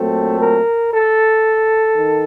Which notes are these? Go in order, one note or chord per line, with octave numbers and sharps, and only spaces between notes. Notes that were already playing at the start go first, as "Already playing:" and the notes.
Already playing: A#2 F#3 A3 C4 A4
A#4
A4
D#3